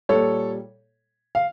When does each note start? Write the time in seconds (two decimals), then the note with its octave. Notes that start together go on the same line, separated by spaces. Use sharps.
0.09 A#2 G3 A4 C#5
1.35 F5